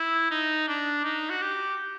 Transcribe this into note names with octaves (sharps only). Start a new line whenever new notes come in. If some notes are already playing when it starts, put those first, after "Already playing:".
Already playing: E4
D#4
D4
D#4
F#4
G4